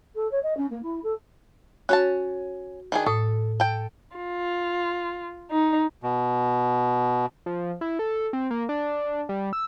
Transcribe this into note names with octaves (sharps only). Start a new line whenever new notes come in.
A4
C#5
D#5
C#4
A#3
E4
A4
C#4 F#4 C#5 A5
D#3 D4 G#4
A2 A4 D#6
A4 G5
F4
D#4
B2
F3
E4
A4
C4
A#3
D4
G3
E6